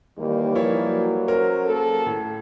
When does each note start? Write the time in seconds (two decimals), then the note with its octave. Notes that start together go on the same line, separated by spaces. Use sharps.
0.18 D#2 E3 G3 A#3
0.55 F3 E4 C#5
0.87 F#3
1.28 C#4 A#4 C5
1.65 A#3 G#4 A4
2.06 A2